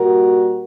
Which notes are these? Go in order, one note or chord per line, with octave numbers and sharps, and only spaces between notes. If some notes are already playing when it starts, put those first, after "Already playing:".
Already playing: A#2 G3 F#4 A#4